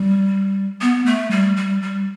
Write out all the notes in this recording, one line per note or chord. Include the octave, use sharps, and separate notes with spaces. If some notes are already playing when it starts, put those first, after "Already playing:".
Already playing: G3
B3
A3
G3
G3
G3